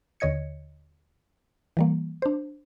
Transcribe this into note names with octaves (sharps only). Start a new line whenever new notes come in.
D#2 D3 C#5 D#5 G#6 C#7
E3 G3 A#3
D4 C5